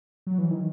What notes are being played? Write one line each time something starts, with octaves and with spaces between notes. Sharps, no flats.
F#3
E3
D#3